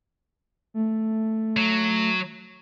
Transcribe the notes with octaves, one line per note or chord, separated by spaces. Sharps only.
A3
F#3